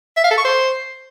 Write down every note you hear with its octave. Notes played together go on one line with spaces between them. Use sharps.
E5
F5
A4
C#6
C5